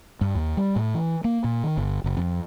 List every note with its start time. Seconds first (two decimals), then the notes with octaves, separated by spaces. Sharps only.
0.21 G2
0.35 D#2
0.57 G3
0.76 A2
0.94 E3
1.24 A#3
1.44 A#2
1.64 D#3
1.77 G1
2.04 F#1
2.17 F2